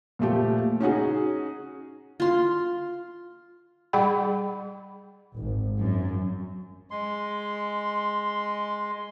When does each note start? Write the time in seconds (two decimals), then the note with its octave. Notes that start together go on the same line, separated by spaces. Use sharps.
0.19 A#2 F3 A3 G4
0.80 C#4 D#4 F#4 G#4
2.20 F4 C6
3.93 G3 G#4 F#5 G5 B5
5.36 G#1
5.80 F#2
6.91 G#3 C6